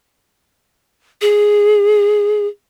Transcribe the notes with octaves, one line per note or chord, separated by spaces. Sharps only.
G#4